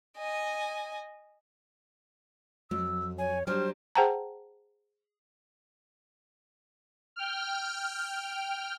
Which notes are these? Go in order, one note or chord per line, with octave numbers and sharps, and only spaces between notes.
D#5 G#5
F2 F#3 E6
C#5 G#5
F#3 G3 D4 G4 C5 F6
G#4 C5 F#5 G5 A5 A#5
G5 F6